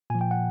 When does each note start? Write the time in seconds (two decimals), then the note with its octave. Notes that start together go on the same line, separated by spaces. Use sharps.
0.10 A#2 G#5
0.15 F3
0.21 G5
0.31 F#5